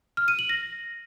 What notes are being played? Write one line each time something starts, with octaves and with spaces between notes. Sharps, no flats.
F6
D#7
F#7
A#6